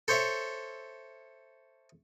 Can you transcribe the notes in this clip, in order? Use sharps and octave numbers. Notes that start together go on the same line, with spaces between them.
A4 C5 C#5 E5